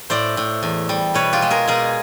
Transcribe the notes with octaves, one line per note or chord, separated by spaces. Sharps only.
A2 C5 D5
A2
E2
G3
B2 B4 C#5
F4 G4
G#3
G#4 A#4
B2 G#4 A#4